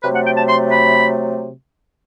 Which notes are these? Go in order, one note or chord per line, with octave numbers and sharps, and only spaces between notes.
C3 F#3 A3 B4
F#5
G5
A5
C6
B5